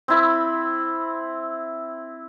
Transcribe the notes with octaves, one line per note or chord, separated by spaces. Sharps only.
C4 E4 B5